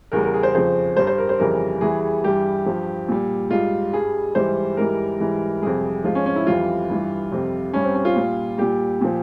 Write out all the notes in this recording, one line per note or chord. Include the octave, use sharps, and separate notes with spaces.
E2 C#3 G3 A#4
A#4
G#4
C5
F2 C#3 F3 C5
G2 G3 C5
C5
A#4
C5
F2 C#3 E3 G3 A#4
E2 E3 G3 G#4
G2 E3 G3 G4
G2 F3
A#2 G3
G#2 G3 F4
G2 G3 G#4
G#2 E3 G3 C5
G#2 E3 G3 A#4
G#2 E3 G3
F2 C3 G3 G#4
G#2 F3 F4
C#4
C#4
E4
F2 E3 G3 F4
G2 E3 G3
F2 C3 G3
G2 G3 C#4
C4
C#4
F4
A#2 G3
A#2 G3 G4
A#2 F3